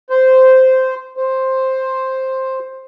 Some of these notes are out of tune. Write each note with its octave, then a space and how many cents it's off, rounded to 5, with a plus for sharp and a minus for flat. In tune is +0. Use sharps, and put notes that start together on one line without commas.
C5 -10
C5 +5